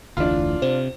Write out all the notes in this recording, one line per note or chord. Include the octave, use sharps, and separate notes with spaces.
F1 D2 E3 D4 F4
C3 C5